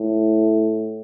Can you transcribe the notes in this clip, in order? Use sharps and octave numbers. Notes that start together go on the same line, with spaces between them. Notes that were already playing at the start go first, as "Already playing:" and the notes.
Already playing: A2